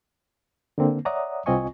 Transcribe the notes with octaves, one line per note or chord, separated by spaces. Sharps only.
D3 A#3 C4
C#5 D5 E5 F#5 A#5 D#6
C2 C4 F4 D#5 G#5 C#6